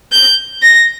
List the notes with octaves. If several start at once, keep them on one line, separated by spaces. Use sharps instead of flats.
G6
A#6